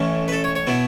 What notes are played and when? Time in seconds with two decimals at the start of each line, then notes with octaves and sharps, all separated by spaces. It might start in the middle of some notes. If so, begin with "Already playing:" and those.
Already playing: A1 A2 E3 A3 C#4
0.28 B4
0.32 A4
0.44 C#5
0.55 C#5
0.67 B2 B3 E4